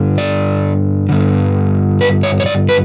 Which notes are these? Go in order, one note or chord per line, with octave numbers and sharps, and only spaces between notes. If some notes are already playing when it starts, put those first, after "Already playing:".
Already playing: G2 D3
D5
G2 D3
B4
C#5
C#5
D5
B4